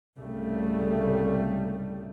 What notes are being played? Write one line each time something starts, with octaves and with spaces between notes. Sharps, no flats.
C2 G#2 C#3 G3 A3